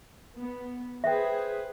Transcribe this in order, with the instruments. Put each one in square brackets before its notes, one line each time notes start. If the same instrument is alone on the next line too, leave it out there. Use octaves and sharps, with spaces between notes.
[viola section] B3
[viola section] G#4 B4 C5 [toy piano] E5 G5